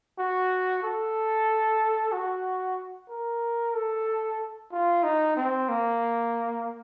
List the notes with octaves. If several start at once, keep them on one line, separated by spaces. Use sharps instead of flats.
F#4
A4
F#4
A#4
A4
F4
D#4
C4
A#3